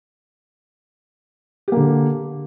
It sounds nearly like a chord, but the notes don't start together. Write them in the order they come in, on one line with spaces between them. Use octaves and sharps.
G4 A#3 D3